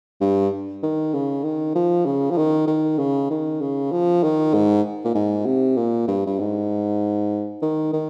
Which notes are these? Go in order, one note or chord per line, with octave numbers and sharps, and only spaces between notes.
G2
D#3
C#3
D#3
F3
C#3
F3
D#3
D#3
C#3
D#3
C#3
F3
D#3
G#2
A#2
G#2
C3
A#2
G2
G2
G#2
D#3
D#3